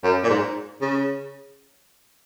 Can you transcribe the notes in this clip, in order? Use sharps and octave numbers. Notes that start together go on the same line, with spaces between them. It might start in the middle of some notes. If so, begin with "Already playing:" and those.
F#2
A#2
G#2
C#3